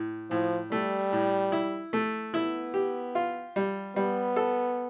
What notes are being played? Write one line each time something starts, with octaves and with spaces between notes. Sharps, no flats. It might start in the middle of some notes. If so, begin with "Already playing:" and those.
Already playing: A2
A2 F3
G3 A3
A2
E4
A3
B3 E4
G4
F4
G3
G3 B3
A4